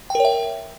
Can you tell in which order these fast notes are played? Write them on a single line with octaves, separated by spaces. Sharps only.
G5 A#4 C#5 E5